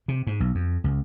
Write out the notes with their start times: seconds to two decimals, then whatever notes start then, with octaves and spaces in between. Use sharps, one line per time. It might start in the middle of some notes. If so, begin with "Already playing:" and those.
0.08 C3
0.27 G#2
0.40 B1
0.55 F2
0.84 C#2